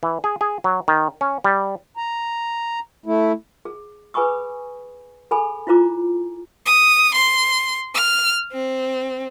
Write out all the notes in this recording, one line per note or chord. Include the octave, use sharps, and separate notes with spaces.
E3
G#4
G#4
F#3
D#3
C#4
G3
A#5
A3 E4
G#4
G#4 B4 G#5 B5 C#6 D#6
G#4 A4 G#5 B5
E4 F4 C5 A#5 D6
D#6
C6
F6
C4